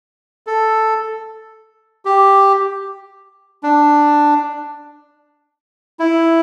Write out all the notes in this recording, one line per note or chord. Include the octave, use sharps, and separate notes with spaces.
A4
G4
D4
E4